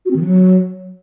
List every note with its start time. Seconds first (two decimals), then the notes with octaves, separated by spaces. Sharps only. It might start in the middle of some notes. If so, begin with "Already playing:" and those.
0.05 F#4
0.10 C4
0.16 D#3
0.21 F3
0.26 F#3